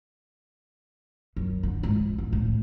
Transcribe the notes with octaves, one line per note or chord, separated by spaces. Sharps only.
F#2
D3
G#2
E2
D1
A2